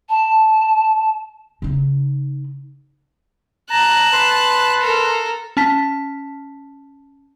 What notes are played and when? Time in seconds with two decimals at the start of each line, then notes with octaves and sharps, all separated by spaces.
0.09 A5
1.62 C#3 D#4
3.70 A5 A#5 F#6
4.13 B4 C6
4.80 A4 A#4
5.57 C#4 A5 B6